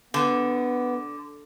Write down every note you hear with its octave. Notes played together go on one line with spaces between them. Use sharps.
D3 B3